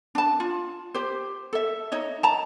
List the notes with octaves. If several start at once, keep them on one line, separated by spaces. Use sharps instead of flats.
D4 A5
F4
G4 C5
A4 E5
D#4 C#5 D#5
A5 A#5